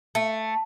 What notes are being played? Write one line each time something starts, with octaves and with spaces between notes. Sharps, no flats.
A3